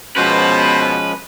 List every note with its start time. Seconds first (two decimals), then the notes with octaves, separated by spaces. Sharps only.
0.16 B2 F3 G#3 C#4 B4 C5